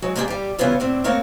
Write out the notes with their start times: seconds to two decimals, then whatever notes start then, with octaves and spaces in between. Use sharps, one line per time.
0.02 F#3 G#3 F#4
0.16 G#3 A#3 B3 D4 G4 G#4
0.28 G3 G4
0.59 C#3 E3 G3 B3 C#4 F4
0.80 A2 C4 D4
1.04 A3 A#3 C4 A#4 C#5 F#5